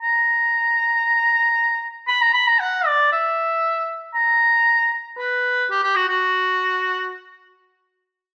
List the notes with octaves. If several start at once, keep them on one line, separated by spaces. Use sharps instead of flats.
A#5
B5
A#5
B5
A#5
F#5
D5
E5
A#5
B4
G4
G4
F#4
F#4